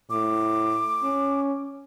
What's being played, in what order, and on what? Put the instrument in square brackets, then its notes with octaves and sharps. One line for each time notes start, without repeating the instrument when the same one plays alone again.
[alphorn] A2 [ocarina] D6
[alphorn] C#4